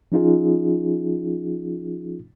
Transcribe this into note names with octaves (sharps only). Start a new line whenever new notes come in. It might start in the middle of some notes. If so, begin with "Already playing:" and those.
F3 C#4 D#4 F4 G#4